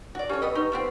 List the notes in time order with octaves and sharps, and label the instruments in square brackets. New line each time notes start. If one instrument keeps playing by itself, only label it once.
[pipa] F#4 D5
[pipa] C#4 A4 C#5 [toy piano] G4
[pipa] B3 B4 D#5 [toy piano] G5 E6
[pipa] D#4 [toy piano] B4 C#6
[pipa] F3 B3 C4